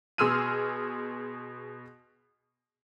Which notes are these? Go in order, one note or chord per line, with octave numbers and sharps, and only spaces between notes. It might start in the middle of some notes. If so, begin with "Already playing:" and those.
B2 G#4 C6 E6 F6 D#7